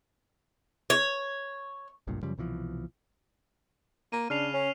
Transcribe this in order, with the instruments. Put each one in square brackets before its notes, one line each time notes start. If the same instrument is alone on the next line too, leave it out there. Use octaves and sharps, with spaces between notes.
[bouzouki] C#5
[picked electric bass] F#1 B1 G2 A#2
F#2 C#3 F3 G3
C2 B2 E3 F3
[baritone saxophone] A#3 [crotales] D#7
[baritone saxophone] C#3 [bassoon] D4 [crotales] F6 C7 F7
[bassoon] C#4